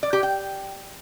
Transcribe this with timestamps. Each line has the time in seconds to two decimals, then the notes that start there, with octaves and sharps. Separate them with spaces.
0.03 D5
0.13 G4
0.23 G5